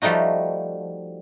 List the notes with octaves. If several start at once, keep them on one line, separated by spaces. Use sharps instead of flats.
F3 G3 A3 D#4 F#4